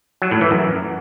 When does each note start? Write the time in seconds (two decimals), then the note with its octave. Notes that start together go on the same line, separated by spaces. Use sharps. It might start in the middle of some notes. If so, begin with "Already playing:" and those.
0.22 F#3
0.31 A2
0.41 E3
0.51 F#2